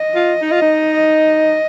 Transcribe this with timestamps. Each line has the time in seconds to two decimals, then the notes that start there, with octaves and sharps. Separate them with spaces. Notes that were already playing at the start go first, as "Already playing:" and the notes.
Already playing: D#5
0.15 F4
0.42 D#4
0.52 F4
0.62 D#4